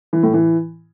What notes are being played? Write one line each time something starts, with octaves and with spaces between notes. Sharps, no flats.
E3
A2
E3